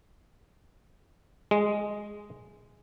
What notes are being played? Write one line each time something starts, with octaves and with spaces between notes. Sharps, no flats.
G#3